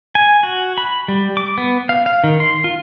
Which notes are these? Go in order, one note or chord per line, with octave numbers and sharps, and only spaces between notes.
G#5
F#4
B5
G3
D6
B3
F5
F5
D#3
C6
F4